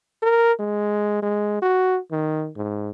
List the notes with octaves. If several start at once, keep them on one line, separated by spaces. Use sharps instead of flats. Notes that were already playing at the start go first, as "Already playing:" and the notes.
A#4
G#3
G#3
F#4
D#3
G#2